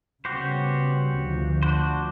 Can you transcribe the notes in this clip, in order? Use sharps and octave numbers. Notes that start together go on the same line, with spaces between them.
C#3 G3 B3 F#4 G4 C5
D2 F3
D4 F#4 C5